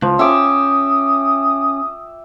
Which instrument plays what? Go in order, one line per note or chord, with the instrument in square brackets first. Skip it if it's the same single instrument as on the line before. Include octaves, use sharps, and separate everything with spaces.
[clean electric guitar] C#2 [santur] F3
[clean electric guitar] C#4 [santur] E5 G5 D6 [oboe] D#6